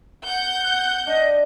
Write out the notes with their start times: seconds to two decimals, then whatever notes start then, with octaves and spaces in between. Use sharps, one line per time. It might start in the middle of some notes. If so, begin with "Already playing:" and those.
0.24 F#5 G6
0.64 F#6
1.07 D4 D#5